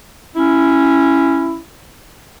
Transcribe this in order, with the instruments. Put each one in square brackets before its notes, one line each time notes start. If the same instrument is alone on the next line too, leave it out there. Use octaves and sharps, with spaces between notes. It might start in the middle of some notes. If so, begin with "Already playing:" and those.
[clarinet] C#4 [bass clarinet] E4